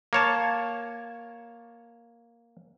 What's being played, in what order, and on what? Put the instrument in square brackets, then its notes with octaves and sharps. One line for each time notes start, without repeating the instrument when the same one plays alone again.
[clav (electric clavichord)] A#3 C#5 A5